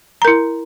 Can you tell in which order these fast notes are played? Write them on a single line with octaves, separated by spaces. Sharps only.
A#5 A#4 E4